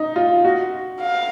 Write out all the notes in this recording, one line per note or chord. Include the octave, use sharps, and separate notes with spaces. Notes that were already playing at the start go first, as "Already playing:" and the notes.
Already playing: D#4
F4
F#4
F5